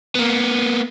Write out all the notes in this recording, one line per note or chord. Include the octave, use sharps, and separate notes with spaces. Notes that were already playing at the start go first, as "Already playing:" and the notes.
A#3 B3